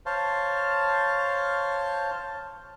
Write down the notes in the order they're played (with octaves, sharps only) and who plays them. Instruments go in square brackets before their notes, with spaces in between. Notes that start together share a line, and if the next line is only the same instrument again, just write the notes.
[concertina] C5 C#5 F5 A5